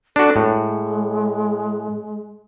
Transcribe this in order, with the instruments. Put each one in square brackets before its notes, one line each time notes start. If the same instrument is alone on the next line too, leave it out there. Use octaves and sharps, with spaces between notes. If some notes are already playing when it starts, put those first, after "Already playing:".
[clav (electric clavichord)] D4 F#4 [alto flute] A4
[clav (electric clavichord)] A2 [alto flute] G#3